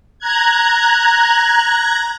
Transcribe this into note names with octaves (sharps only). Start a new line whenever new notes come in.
A#5 F#6 G#6